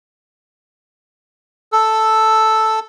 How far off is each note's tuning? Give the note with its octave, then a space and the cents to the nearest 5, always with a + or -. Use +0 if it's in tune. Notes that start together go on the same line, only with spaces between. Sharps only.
A4 +0 E6 +0